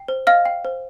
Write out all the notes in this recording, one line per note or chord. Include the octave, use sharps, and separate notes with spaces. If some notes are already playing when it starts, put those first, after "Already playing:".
Already playing: G5
C5
D#5 F5 F6
G5
C5